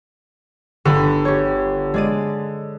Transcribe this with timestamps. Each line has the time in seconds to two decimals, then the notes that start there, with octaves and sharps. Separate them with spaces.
0.85 G1 D3 B5 D#7
1.25 G4 C#5
1.94 G#3 D5 D#7